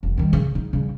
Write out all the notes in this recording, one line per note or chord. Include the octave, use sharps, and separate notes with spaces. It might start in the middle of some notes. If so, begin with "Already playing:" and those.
F1
D#3 G3
C#3
D#4
C#3 G3